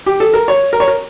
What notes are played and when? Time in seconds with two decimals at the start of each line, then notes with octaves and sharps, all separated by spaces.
0.06 G4
0.20 A4
0.33 A#4
0.48 C#5
0.73 A#4
0.80 C#5
0.88 A#4